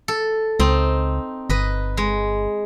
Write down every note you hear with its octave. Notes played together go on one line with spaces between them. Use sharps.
A4
C#2 C4 D#4
G1 B4 D#5
G#3